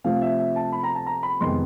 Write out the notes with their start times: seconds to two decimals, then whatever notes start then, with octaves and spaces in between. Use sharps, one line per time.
0.04 C3 F3 A3 F5
0.22 E5
0.39 E5
0.56 A5
0.72 B5
0.83 A#5
0.95 A5
1.06 A#5
1.23 B5
1.41 F2 C3 D#3 G#3 B3 C6